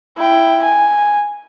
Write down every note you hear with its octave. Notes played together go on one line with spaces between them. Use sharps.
E4 G5
G#5